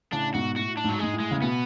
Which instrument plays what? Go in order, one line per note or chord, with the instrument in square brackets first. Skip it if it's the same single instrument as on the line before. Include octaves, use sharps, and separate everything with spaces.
[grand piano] A2 C#3 [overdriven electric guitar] D4
[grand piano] G#2 B2 [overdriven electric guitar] F#4
[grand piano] A2 [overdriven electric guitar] F#4
[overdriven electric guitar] D4
[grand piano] G#2 [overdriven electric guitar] F#3
[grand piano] G#2 [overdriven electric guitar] G#3
[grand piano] A2
[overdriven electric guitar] G#3
[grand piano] C#3
[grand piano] B2 [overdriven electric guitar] B3